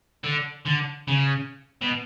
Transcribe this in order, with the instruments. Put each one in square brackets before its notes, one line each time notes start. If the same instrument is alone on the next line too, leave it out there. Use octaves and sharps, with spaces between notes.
[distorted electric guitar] D3
D3
C#3
B2